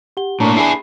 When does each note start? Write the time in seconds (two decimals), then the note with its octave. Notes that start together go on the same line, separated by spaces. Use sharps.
0.17 G4 F#5 G7
0.40 A2 A#3 D4 A#5 C#6
0.57 E4 G#4 B5 C7